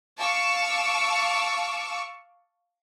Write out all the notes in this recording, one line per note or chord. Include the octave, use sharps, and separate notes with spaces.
F5 A5 C#6 D6 E6